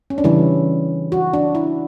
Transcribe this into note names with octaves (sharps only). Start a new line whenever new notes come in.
C#4
D4
C#3 E3 G3 C#4 E4
F#4
D4
E4